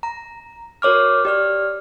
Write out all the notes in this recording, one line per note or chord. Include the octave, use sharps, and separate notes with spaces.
A#5
F#4 A#4 C#5 D6 F6
G4 D5 F6